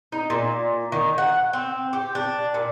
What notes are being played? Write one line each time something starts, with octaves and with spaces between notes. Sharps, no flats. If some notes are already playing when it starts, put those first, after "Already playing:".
D#4
A#2
D#3
F#5
C4
G4
D4
A#2